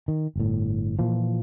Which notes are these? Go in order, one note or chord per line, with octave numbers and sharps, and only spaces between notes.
D#3
G1 A2
A#2 E3 F3